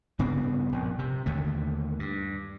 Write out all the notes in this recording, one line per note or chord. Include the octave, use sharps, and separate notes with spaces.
G2 C#3 B3 C4
A#1
C3
D#2 D3 A3
G2